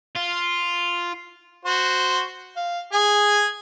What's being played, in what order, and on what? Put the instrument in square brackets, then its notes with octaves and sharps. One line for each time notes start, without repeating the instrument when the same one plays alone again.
[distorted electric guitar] F4
[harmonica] F#4 C5
F5
G#4 G#5